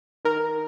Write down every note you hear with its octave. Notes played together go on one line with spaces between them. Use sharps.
D#3 A#4